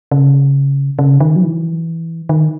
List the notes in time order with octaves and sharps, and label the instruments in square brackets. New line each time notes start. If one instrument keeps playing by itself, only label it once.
[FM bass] C#3
C#3
D#3
F#3
E3
D#3